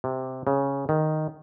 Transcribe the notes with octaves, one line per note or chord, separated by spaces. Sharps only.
C3
C#3
D#3